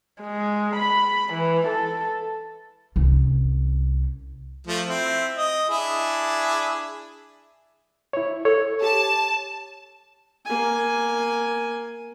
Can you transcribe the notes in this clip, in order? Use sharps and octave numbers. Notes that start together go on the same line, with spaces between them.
G#3
B5
E3
A4
C2 C#4
F3 A3
C4 E4
D#5
D4 E4 G#4
E4 C#5
A4 C#5
G4 A5
A#3 G#5